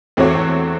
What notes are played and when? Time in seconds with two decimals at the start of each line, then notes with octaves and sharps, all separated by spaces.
0.17 E2 A3 C4 F#4 C#5
0.35 E2